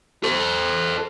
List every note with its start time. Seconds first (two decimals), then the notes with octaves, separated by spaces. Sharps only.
0.24 A4 C5